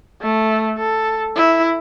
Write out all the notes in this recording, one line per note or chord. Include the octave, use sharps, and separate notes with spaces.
A3
A4
E4